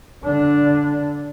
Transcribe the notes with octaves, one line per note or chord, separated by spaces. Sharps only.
D3 D4